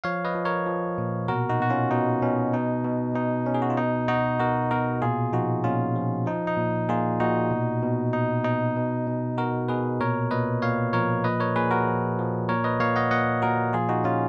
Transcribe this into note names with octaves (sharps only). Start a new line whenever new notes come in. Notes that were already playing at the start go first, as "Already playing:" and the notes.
F3 C#5 F5
B4 D#5
F3
A#4 C#5
F3
A#2
B2 F#4 A#4
D#4 F#4
B2 F#4
C#4 F4
B2 D#4
B2 C#4
B2 D#4
B2
B2 D#4
B2 C#4
G#4
F#4
F4
B2 D#4
B2 D#4 F#4
B2 F#4 A#4
B2 F#4 A#4
A#2 F4 G#4
F3 D#4 F#4
A#2 C#4 F4
F3
F3 D#4
D#4
A#2
A#2 F4 G#4
A#2 D#4 F#4
B2
B2
B2 D#4
B2 D#4
B2
B2
B2 F#4 A#4
B2 G#4 B4
A#2 A#4 C#5
A#2 B4 D#5
A#2 C#5 F5
F3 A#4 C#5
A#2 B4 D#5
A#4 C#5
A#2 G#4 B4
F#4 A#4
F3
F3
A#2 A#4 C#5
B4 D#5
A#2 C#5 F5
D#5 F#5
A#2 D#5 F#5
A#2 F#4 A#4
F3 F4 G#4
D#4 F#4
A#2 C#4 F4